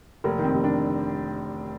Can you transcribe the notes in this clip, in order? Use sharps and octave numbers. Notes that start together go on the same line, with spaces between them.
F1 A#3
D#3
C4
F1
D4